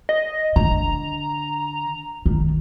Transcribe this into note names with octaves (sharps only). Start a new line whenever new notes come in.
D#5
D3 A#5
D#3